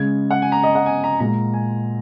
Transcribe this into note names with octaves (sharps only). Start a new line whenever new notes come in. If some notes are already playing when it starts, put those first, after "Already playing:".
Already playing: C#3 G#3 G#6
F#5
G#5
A#5
D#5
F#5
G#5
A#5
A#2 G#3 A#5
G#5